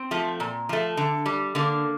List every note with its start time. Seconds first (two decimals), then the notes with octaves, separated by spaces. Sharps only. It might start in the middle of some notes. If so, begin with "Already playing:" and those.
Already playing: C4
0.11 F3 A3
0.40 A#2
0.69 F3 A3
0.97 D3
1.26 G3
1.55 D3 A#3